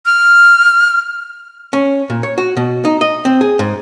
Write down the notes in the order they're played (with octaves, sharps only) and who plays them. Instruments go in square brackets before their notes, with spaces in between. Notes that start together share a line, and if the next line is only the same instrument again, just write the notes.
[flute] F6
[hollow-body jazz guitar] C#4
A#2
C#5
F#4
B2
D#4
D#5
C4
G#4
G#2